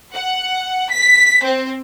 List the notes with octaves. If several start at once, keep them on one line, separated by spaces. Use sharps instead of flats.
F#5
B6
C4